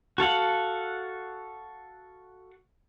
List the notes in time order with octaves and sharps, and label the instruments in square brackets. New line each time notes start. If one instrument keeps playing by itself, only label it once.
[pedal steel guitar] F#4 A4 F5 F#5